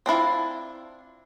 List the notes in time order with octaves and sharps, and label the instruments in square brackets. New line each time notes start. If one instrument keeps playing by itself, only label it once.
[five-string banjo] C4 D4 E4 F4